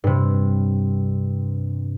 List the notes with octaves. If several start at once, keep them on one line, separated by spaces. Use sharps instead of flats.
G2 C3